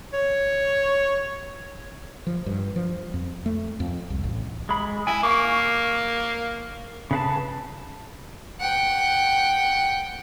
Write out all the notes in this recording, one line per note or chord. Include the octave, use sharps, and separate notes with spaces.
C#5
F3
G2
F3
F2
A3
F2
C2
A1
G#3 B5
E4 G#5
A#3 F5 C#6 D6
C#3 B4 A5
F#5 G5